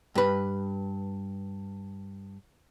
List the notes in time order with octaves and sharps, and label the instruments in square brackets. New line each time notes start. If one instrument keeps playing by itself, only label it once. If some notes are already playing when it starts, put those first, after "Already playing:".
[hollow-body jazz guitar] G2 B4